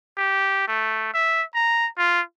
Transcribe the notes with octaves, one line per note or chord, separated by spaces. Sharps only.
G4
A3
E5
A#5
F4